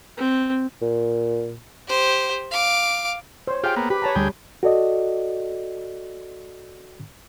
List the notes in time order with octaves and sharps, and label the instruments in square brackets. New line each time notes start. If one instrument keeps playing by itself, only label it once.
[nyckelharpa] C4
[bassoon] A#2
[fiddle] G4 C5
F5 D6
[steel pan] C5 C#5
[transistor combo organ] F4 G4 [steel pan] G#4 G5
[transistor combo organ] A#3 B3
[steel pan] G4 [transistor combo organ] B4
[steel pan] C#5 A5 A#5
[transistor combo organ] D2 G#4 G5 [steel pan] G3 B5
[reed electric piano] F#4 A4 D5 D#5